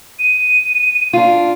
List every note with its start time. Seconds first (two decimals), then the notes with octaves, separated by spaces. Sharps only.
0.19 D#7
1.13 D4 F4